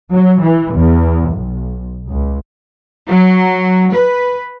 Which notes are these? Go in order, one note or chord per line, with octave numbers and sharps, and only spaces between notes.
F#3
E3
E2
B1
C#2
F#3
B4